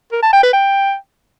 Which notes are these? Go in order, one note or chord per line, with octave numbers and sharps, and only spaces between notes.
A#4
A5
G5
B4
G5